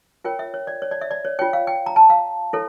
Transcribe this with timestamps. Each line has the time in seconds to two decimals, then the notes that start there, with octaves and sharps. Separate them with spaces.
0.24 F4 A#4 C#5 G5
0.39 E5
0.54 C#5
0.67 D5
0.82 C#5
0.91 D5
1.01 E5
1.11 D5
1.25 C#5
1.39 F4 C#5 G5
1.53 F5
1.67 G5
1.86 A#5
1.96 A5
2.10 F5
2.53 E4 A4 C#5